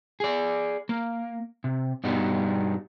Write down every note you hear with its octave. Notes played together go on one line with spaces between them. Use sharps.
G#4 D5
A#3
C3
G2 B2 G3 B3 D#4